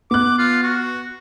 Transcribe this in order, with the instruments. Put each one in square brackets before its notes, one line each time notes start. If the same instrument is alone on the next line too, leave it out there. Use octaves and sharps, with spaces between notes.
[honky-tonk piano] B3 F#6 [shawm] D6
[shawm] F4
F#4